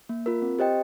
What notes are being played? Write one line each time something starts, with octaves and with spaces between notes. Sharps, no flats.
A#3
F4 A#4
C4
G4 C5 D#5 G5